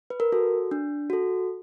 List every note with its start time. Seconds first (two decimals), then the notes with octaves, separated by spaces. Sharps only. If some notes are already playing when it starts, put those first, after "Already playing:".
0.10 B4
0.20 A#4
0.32 F#4 A4
0.71 D4
1.10 F#4 A4